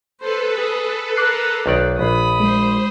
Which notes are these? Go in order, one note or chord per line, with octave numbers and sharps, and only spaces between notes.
A4 B4 C5
G#4
A#4 D6 F#6 C7
B1 D#3 D5
A#1 B5 D#6
G#3 C5